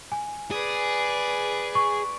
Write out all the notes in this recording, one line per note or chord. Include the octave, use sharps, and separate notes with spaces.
G#5
G#4 B4 D5
C#6